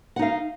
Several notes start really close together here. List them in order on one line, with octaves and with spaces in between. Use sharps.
F#5 D#4 F5